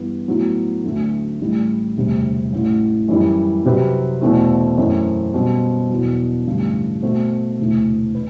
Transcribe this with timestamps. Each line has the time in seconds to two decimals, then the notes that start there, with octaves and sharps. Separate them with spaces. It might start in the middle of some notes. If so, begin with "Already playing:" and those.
Already playing: G2 E3 B3
0.28 A2 F#3 B3 E4
0.84 D2 D3 F#3 A3
1.41 A1 A2 E3 G3
1.96 E1 D2 C3 G3
2.53 A1 A2 E3
3.08 F#2 E3 G3
3.65 C3 F#3 C4 G4 B4
4.21 E2 B2 A3 C4 E4
4.77 F#2 E3 A3 C4
5.34 B2 G3 C4
5.90 E2 B2 F#3
6.46 A1 G2 D3
7.03 B2 A3 C4 F#4 C5
7.59 E1 D2 C3 E3 A3
8.15 B4